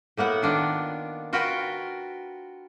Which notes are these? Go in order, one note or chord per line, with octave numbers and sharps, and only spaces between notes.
A2 A#3 B3 F#5
D#3 D4 F4
F4 F#4 A#4 B4 F5 G5